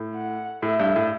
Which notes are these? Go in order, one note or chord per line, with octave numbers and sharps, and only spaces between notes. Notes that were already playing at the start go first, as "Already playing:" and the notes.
Already playing: A2
F#5
A2 E5
G2
A2